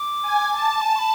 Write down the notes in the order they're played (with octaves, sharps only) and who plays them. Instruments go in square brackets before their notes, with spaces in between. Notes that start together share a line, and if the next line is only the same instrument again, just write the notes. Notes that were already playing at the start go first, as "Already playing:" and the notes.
Already playing: [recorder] D6
[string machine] G#5
A5
[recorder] G#5
C#6
B5